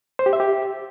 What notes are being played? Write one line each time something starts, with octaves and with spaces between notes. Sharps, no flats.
C5
G4
E5
G4